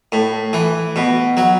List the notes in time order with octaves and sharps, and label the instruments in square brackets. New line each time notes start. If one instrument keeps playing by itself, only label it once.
[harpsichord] A2
E3
B2
F#3